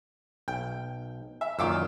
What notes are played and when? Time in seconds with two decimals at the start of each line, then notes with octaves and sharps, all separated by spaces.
0.48 B1 G5
1.41 E5
1.59 F#2 A#2 D#3 F4 D6 E6